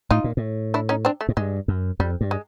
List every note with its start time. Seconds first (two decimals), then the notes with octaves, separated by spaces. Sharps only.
0.10 A2 D#4 F4
0.24 A#2
0.37 A2
0.74 D4 E4
0.89 C#4 D#4
1.05 C4 D4
1.21 A3
1.29 G#2
1.37 G2 G#3
1.68 F#2
2.00 F2 G3
2.21 G2
2.31 G#3